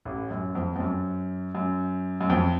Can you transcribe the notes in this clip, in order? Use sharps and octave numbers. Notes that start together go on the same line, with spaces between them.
A1 A2
F#2
F2
F2
F#2
F#2
F#2
F2